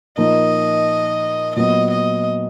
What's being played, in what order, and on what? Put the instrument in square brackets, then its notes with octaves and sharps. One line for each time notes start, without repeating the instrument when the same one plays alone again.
[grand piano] A#2 F3 A#3 D#4 [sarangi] D#5
[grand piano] A#2 F#3 B3 [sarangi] D#5
[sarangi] D#5